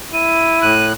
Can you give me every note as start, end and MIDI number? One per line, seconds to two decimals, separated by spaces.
0.13 0.75 64
0.13 0.62 99
0.62 0.93 45
0.62 0.93 90
0.62 0.86 99